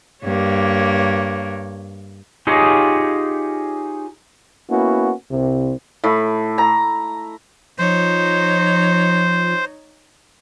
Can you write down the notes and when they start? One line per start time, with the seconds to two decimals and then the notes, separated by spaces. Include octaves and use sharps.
0.24 G2 A#3 C#5
2.47 D#4 F4 G4 G#4 C#5 D#5
4.70 A#3 B3 C#4 E4 F#4
5.31 C2 C3
6.04 A2
6.58 A#5
7.79 F3 D#4 C5 C#5